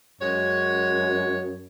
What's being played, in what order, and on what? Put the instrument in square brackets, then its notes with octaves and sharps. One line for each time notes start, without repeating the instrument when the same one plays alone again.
[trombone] F#2 [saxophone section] G#3 F#4 C#5